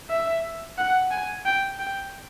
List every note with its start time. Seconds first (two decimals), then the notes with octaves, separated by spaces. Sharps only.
0.10 E5
0.78 F#5
1.11 G#5
1.45 G5
1.79 G5